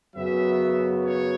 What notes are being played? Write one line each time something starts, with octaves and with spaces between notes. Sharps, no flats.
F#2 C#3 F#3 B3 E5
C#5